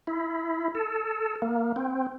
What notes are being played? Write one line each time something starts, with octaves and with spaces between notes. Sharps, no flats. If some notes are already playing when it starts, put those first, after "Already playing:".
E4
A4
A#3
C4